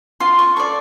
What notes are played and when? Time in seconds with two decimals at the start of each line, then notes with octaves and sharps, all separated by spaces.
0.20 F4 C6
0.39 C#6
0.56 A4 D5 C#6